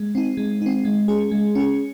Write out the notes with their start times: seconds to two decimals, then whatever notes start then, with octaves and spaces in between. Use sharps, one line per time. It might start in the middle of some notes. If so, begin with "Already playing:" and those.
Already playing: G#3
0.15 C4 D#4
0.37 G#3
0.62 C4 D#4
0.85 G#3
1.08 C#4 G#4
1.31 G#3
1.55 C#4 G#4